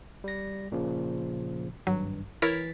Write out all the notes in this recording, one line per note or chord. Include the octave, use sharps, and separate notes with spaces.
G3 A#6
A#2 C#3 F3
G#1 G2 F#3
E3 E4 A#4 C#5 A6 B6